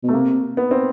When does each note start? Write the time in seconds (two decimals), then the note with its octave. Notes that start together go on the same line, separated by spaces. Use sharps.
0.03 B2
0.09 A3
0.13 C3 A#3
0.57 B3
0.71 C4